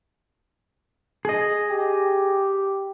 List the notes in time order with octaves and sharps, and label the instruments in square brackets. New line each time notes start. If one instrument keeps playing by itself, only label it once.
[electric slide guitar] G#4 D#5
[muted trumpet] G4